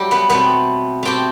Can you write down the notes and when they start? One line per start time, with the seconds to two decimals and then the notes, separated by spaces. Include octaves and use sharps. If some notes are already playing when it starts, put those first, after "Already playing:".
Already playing: F#3 G3 A3 E4 G4
0.11 B3 B4
0.29 B2 A3 B3 C4 B4
1.03 B2 A3 C4 G4 G5